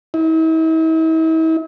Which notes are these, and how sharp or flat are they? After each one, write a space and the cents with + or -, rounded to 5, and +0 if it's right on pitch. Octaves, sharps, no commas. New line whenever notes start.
E4 -45